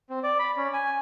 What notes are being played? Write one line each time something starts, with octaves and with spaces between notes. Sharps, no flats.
C4
D5
B5
C#4
G#5